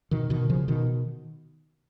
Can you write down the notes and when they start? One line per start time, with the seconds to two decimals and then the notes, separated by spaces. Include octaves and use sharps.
0.11 B2 D#3
0.30 B2 D#3
0.50 C#3 F3
0.68 B2 D#3